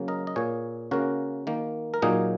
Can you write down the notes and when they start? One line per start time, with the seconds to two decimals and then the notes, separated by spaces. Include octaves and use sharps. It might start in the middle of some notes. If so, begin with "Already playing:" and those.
Already playing: C#3 F#3 A#3
0.08 A#4 D#5
0.27 D#5
0.36 A#2 A#3 G#4 C#5
0.91 C#3 A#3 F#4 A#4
1.47 D#3 A#3
1.94 A#4
2.02 A#2 F#3 A#3 D#4 G#4